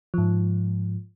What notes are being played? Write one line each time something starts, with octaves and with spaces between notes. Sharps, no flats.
G#2 F3